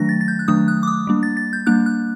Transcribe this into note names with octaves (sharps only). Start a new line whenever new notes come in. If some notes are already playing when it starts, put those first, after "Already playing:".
Already playing: D#3 F#3 A3 D4 A#6
A6
A6
G6
F#6
D#3 F#3 A3 D4 D#6
F#6
D6
D#6
G3 A#3 D4
A6
A6
G6
G3 A#3 D4 F#6
F#6